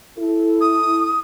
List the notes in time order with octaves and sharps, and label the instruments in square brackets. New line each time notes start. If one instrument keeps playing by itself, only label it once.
[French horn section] E4 A4
[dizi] D#6